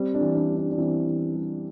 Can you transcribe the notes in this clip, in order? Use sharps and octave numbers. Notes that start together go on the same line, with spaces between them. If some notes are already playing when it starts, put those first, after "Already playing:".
Already playing: G3 C4
D4
E3
D4
G3
D4
D4
E3 C4 E4
E3
G3